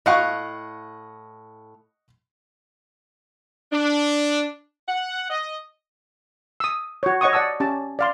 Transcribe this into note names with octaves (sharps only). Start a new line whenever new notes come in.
A2 D#5 F5 F#5 C#6
D4
F#5
D#5
D#6 E6
F#4 C#5
C#5 D#5 F#5 C#6 D#6
D5 F#5 A5 D#6 E6
C#4 G4 A5
D5 F5 C6